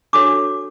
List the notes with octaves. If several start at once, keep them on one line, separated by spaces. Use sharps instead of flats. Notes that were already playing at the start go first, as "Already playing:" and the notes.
D4 F#4 A4 C#5 D6